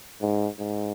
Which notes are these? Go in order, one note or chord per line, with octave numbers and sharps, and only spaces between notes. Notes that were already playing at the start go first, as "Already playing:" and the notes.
G#2
G#2